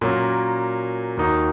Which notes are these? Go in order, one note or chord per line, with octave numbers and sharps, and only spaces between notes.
A#2 F#3 A#3 C#4
D#2 D#3 A#3 D#4 F#4